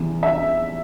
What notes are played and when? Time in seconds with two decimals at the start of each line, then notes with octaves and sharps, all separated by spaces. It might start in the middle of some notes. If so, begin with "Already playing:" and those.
Already playing: E2 C3 E3
0.23 E5